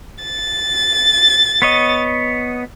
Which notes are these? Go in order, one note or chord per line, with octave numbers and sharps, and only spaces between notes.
A6
B3 C#5 D#5